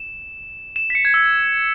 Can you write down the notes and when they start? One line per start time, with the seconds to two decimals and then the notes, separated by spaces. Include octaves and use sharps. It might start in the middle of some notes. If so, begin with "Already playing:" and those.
Already playing: E7
0.76 E7
0.90 B6
0.95 C#7
1.05 G#6
1.14 E6